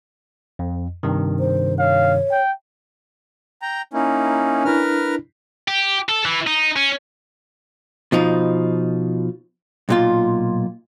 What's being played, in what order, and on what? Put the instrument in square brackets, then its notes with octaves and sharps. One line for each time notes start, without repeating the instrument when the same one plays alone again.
[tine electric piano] F2
G2 C3 D#3
[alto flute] C5
[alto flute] C#5 [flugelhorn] F5
[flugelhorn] G5
[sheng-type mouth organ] G5 A#5
[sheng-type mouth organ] A#3 D#4 E4 [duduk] C#4
[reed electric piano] D4 E4 [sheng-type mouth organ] A#4 B4 F6
[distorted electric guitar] G4
A4
E3
D#4
C#4
[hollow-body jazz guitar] B2 F3 D#4
B1 A#2 F4